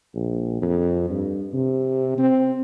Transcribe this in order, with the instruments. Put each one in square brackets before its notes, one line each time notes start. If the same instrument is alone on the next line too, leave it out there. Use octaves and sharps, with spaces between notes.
[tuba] A#1
F2
G2
C3
C4